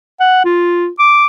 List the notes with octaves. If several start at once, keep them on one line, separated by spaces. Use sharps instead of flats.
F#5
F4
D6